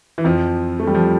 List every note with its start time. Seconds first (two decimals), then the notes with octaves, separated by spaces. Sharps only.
0.18 E3
0.24 F2 F3
0.80 A3
0.87 G3
0.95 F3